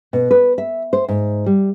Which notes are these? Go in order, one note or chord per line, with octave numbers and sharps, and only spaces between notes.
B2
B4
E5
C5
G#2
G3